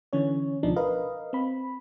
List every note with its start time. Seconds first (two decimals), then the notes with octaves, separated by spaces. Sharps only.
0.13 D3 E3 C#4 C#5
0.63 C#2 B2 F3 D4 D#4
0.76 A#4 B4 D#5 F5
1.33 C4 B5